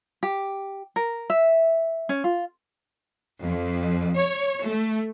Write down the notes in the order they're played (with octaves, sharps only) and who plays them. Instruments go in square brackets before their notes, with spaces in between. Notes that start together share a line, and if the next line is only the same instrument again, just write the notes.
[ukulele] G4
A#4
E5
C#4
F4
[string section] F2
C#5
A3